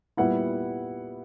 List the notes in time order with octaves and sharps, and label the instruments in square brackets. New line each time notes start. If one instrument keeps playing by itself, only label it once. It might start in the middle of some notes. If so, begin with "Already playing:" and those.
[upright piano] A#2 G3 B3 E4 F#5